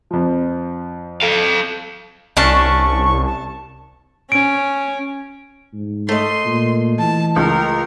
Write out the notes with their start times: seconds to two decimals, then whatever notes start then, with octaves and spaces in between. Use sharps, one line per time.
0.11 F2 F3
1.22 A4 F5
2.37 C2 C#4 D4 A5 C#6
3.25 A5
4.32 C#4 D7
5.73 G#2
6.09 A3 D#5 C6
6.45 A#2
6.99 E3 A5
7.36 C#2 A#4